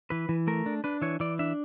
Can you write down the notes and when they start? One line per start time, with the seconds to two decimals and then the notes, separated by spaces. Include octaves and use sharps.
0.10 E3 B4
0.29 E3
0.47 A3 A#4
0.66 D4
0.84 D4 B4
1.02 E3 C#5
1.20 E3 D5
1.39 D4 E5